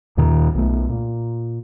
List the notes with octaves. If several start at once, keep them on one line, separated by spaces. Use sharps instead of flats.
D#2 A#2 D#3
B1 A3
A#2